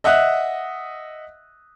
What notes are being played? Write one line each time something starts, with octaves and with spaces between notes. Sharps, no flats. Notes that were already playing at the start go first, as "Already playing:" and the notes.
D#5 E5 F#5 D#6 F#6